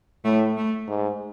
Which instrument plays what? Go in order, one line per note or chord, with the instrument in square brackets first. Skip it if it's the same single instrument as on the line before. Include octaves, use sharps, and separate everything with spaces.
[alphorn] A2 [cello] A3
[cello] A3
[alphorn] G#2